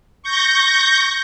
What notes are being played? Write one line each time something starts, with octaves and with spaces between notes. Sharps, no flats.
C#6 G6 A#6